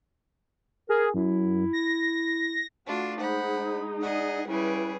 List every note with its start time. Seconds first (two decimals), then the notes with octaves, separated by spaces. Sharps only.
0.89 G#4 A#4
1.14 F#2 E4
1.73 A#6
2.87 A3 D4 F4 F#4
3.20 G#3 D#4 C5 F#5 B5
4.02 G#4 D5 D#5 F#5
4.48 C#3 G3 E4 G#4 B4